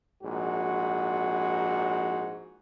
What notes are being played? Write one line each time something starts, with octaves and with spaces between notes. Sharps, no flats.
A#1 G#2 F#4